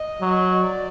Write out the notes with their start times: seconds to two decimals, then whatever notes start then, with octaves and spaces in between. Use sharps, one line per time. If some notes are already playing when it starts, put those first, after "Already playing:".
Already playing: D#5
0.21 F#3
0.60 D5